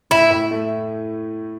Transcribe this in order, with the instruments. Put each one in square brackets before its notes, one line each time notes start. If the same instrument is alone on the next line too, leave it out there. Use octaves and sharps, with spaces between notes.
[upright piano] A2 [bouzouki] E4
[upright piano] A2
A3